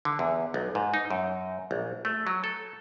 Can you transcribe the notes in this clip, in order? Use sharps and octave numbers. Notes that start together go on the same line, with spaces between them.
D3
E2
B1
G#2
D#4
F#2
A#1
A3
F#3
A4